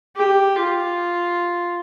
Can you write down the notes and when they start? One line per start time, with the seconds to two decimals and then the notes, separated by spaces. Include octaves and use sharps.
0.16 G4
0.56 F4